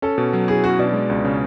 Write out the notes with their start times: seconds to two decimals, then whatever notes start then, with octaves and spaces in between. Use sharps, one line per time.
0.02 C#4 A4
0.18 B2
0.33 F#3
0.48 E4 G#4
0.64 C#4 F#4
0.79 B2 D4
0.94 G#3
1.10 C#2
1.25 C#3